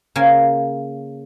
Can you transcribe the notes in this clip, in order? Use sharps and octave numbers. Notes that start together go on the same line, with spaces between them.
C#3 A#3 G#5